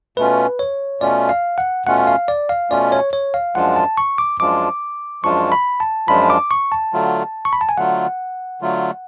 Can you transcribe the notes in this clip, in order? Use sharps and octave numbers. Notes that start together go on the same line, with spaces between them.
B2 A3 C#4 F4 B4
C#5
B2 A3 C#4 F4 D5
F5
F#5
B2 A3 C#4 F4 F#5
F#5
F5
D5
F5
B2 A3 C#4 F4 D5
C#5
C#5
F5
F#2 F3 G#3 D4 F4 F#5
A5
C#6
D6
F#2 F3 G#3 D4 F4 D6
F#2 F3 G#3 D4 F4 C#6
B5
A5
F#2 F3 G#3 D4 F4 B5
D6
C#6
A5
D3 F#3 A3 F4
C#6
B5
A5
G#5
D3 F#3 A3 F4 F#5
D3 F#3 A3 F4